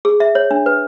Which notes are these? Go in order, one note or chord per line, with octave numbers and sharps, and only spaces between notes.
G#4
E5
C#5
D4
B4